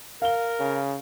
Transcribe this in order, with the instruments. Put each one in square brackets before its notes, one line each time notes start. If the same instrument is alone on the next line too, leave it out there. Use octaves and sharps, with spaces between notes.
[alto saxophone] A#4 [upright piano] F5 G7
[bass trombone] C#3